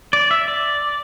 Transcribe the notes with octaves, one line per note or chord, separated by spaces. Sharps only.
D5
E5
D5